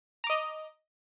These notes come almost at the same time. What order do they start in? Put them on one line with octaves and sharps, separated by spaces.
A#5 D6 D#5